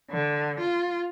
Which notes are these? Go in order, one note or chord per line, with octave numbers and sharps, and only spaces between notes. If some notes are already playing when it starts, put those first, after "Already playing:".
D3
F4